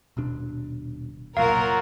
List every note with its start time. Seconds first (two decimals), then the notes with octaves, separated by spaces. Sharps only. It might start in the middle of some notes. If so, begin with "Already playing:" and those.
0.17 D#1 B2 D4
1.37 F1 B1 A#2 F#3 F4 F#4 A#4 F5